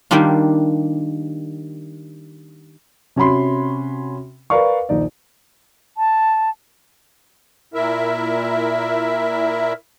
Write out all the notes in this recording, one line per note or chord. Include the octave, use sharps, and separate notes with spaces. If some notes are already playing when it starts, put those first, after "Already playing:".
D#3 G3 A#3 D4 F4
C3 C#4 F#4 B5 C6
A#4 B4 D5 F5 C#6
A#1 D#2 D#4 D5
A5
A#2 E4 A#4 E5